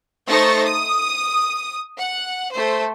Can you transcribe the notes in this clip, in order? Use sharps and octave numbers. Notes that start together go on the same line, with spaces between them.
A3 D#4 C5 C#6 A6 A#6
D#6
F#5
A3 C5